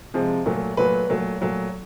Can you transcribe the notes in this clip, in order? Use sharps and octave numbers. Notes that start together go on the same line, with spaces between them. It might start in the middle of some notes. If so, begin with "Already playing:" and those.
C3 F3 G#3
A#2 F#3 A3
A#2 F#3 A3 B4
A#2 F#3 A3
A#2 F#3 A3